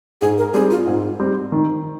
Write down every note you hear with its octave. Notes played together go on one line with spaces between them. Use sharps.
G#2 G#4
A#4
G3 C4 G#4
F4
G#2
G3 C4
D#3